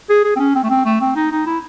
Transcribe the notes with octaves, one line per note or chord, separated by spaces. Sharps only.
G#4
G#4
C4
C#4
C4
A3
C4
A3
C4
D#4
D#4
E4